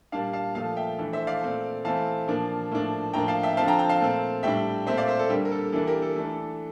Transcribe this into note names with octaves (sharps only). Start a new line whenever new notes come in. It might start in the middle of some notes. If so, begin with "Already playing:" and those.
A#2 G3 A#3 D4 F5 A5
F5 A5
A#2 F3 A3 F5 A5
E5 G5
E3 A3 D4
C5 E5
D5 F5
A#2 A3 C4
E3 A3 C4 F5 A5
A#2 F3 A#3 D4
A2 F3 A#3 D4
A2 F3 A#3 D4 G5 A#5
F5 A5
E5 G5
D3 F3 C4 F5 A5
G5 A#5
G5 A#5
F5 A5
A#2 A3 C4
A2 G3 D4 E5 G5
A#2 A3 C4 C5 E5
D5 F5
C5 E5
A4
D3 G3 A#3 G4
A#4
A4
E3 A#3 D4 A4
G4 A#4
A4
E3 A3 D4